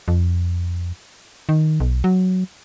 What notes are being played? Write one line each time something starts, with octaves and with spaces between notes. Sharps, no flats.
F2
D#3
B1
F#3